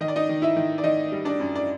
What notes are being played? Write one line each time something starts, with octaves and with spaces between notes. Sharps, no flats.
D#3 D#5
D5
D#4 D#5
D#3
E4 E5
D#3
D5
D#3 D#4 D#5
G3
D4 D5
F#2
D5